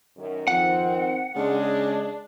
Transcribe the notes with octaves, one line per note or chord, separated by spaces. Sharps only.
F#2 D#3
F2 D#3 C4 F#5
C#3 G#3 D4